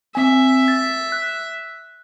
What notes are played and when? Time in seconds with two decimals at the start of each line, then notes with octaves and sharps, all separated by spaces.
0.15 C4 E5 G#5
0.68 A6
1.12 F#6